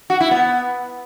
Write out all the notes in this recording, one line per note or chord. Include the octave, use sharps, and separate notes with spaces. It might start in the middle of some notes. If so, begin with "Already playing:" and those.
F#4
E4
B3